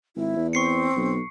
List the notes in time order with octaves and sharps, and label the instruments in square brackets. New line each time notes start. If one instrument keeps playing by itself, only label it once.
[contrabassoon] G#1 [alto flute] E4
[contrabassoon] E2
[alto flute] C4 [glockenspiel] C#6 C7 C#7
[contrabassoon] B1